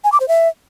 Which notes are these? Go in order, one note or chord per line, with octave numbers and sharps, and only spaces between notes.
G#5
D6
C5
E5